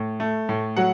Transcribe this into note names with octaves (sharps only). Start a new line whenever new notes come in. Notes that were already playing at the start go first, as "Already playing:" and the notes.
Already playing: A2
A3
A2
F#3 F#5